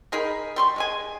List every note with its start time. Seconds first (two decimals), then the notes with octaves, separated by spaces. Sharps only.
0.12 D#4 G#4 A#4 B5
0.56 G3 C6 C#6
0.76 G#3 G#4 G#5